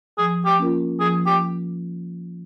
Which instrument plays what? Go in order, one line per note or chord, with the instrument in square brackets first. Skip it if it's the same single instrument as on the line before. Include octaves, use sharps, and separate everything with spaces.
[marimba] F3 [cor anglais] G#4
[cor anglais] G4
[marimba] A#3 C#4 F4 A#4
[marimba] F3 [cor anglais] G#4
[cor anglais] G4